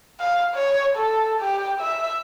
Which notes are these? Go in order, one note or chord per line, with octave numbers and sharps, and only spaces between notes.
F5
C#5
A4
G4
E5